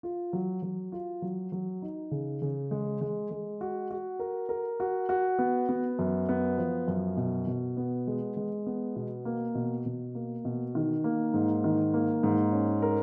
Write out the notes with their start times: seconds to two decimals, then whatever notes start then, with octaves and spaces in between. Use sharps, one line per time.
0.03 F4
0.33 F#3
0.62 F#3
0.92 F4
1.22 F#3
1.52 F#3
1.82 D#4
2.11 C#3
2.42 C#3
2.71 G#3
3.01 G#3
3.31 G#3
3.61 F#4
3.91 F#4
4.19 A#4
4.49 A#4
4.80 F#4
5.09 F#4
5.39 B3
5.69 B3
5.99 F#2
6.29 B3
6.58 F3
6.88 F#2
7.17 B2
7.47 B2
7.77 B3
8.07 G#3
8.37 G#3
8.67 B3
8.96 B2
9.25 A#3
9.55 B2
9.86 B2
10.15 A#3
10.45 B2
10.75 D#3
11.04 A#3
11.34 G#2
11.64 D#3
11.94 A#3
12.23 G#2
12.53 C#4
12.82 A#4